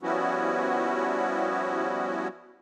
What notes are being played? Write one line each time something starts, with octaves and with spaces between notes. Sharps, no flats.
F3 G3 B3 C#4 E4 F#4